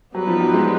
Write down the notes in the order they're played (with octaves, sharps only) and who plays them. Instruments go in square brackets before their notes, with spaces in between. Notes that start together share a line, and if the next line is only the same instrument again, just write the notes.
[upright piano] F#3 [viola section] G3 B3 D#4 G4 B4
[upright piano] F3
F#3
G#3